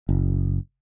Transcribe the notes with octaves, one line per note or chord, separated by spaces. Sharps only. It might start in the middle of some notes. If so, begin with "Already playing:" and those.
F#1